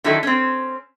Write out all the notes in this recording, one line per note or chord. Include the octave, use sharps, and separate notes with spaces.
D3 D#3 F#3 E4 A4
C4 C#4